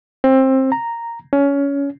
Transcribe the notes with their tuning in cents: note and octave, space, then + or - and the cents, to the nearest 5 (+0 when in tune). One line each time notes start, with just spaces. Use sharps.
C4 +20
A#5 -5
C#4 +20